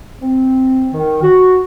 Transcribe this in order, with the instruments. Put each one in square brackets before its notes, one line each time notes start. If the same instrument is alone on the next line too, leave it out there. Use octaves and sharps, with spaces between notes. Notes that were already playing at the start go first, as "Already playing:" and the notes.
[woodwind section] C4
D#3
F#4